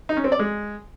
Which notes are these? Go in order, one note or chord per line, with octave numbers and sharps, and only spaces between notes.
D#4
C#4
C4
D5
G#3